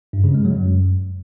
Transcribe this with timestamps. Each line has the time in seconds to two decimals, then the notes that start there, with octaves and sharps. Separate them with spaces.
0.13 G2
0.24 C#3
0.34 G#3
0.45 F#3
0.55 F#2